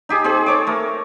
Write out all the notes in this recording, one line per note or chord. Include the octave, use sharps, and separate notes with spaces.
D#4 G4 G#4
C4 G#4
A4 C#5 D6
A3 A#4